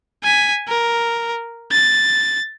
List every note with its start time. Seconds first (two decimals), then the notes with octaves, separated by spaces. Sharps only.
0.24 G#5 B6
0.68 A#4
1.72 A6